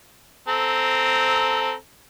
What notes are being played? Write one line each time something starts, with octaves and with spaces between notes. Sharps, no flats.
C4 A4 A#5